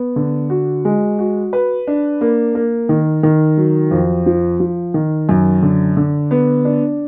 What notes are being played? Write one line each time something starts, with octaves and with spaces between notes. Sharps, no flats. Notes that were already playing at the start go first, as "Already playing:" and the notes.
Already playing: B3
D3
F#4
G#3
F#4
B4
D4
A#3
A#3
D#3
D#3
F#3
F2
F3
F3
D#3
F#2
D3
D3
B3
D4